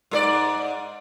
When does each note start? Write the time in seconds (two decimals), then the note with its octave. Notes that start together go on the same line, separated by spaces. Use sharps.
0.11 G#2 G#4 D5